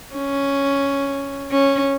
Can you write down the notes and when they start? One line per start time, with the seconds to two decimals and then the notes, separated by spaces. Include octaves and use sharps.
0.15 C#4
1.51 C#4